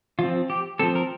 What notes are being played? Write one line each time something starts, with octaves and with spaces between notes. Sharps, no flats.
F3 C4 F4
G4
F3 C4 A4
A#4